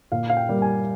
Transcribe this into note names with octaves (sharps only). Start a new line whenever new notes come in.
A#2 F5
F5
G5
G3 A#3
G#5